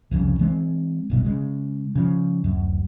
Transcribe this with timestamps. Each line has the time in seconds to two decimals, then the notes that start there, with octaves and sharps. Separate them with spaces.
0.11 C2 F2 C#3
0.39 E3 G#3 C4
1.10 F#1 B1 B2
1.25 C#3 G#3
1.95 C#3 F3
2.44 D1 F#2